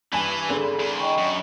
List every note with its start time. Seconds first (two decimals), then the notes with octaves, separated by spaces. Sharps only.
0.13 G2 E3 G#5
0.49 G#1 D3 G#4 A4
0.79 E2
0.99 D#5 G5 C#6
1.18 F#2